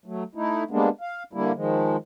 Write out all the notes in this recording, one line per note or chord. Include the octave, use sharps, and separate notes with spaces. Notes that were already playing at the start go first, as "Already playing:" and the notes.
F#3 A3
A3 D#4 E4
G3 G#3 A#3 B3 D4
F5
D3 G3 A3 A#3 E4
D#3 F3 G#3